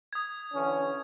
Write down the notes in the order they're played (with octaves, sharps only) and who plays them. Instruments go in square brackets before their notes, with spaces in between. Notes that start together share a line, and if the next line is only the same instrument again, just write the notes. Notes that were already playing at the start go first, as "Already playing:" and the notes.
[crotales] D#6 G#6
[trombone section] D3 E3 C#4